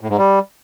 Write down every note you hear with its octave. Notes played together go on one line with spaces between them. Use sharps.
A2
G#2
G3